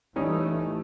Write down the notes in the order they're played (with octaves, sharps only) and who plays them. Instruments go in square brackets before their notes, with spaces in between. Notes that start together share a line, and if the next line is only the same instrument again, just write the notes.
[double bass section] E3 A3 [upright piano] G3 C#4 D#4